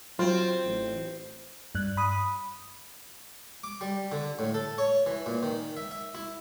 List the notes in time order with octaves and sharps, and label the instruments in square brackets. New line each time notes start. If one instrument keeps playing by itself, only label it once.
[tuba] F#3 [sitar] C4 [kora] F4
[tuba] A1
[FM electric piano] G2 F#6
B5 D#6
[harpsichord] D6
G3
D3
A2
A4
C#5
E3
A#2
D#3
E5
E5
E4